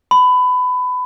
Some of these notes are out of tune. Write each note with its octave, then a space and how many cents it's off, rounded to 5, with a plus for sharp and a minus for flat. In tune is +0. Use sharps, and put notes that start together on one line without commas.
B5 +20